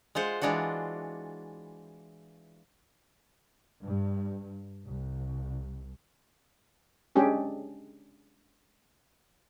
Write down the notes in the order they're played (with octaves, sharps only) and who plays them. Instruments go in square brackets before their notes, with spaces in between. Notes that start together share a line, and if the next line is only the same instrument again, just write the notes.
[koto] G#3 F4 C5 F#5
E3 G#3 D4 F4 F#4
[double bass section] G2
C2
[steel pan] G#3 C#4 D4 G4 G#4